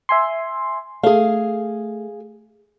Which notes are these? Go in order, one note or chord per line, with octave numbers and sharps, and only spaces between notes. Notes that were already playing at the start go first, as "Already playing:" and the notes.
E5 G#5 C6
A3 G#4 F5